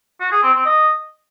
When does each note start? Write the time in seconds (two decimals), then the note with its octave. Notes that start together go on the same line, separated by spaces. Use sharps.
0.20 F#4
0.31 G#4
0.43 C4
0.54 C4
0.65 D#5